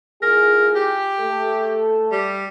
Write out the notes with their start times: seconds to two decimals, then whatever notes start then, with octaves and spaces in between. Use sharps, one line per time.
0.22 E2 F4 G#4 A#4
0.75 G4
1.21 A3 A4
2.12 G3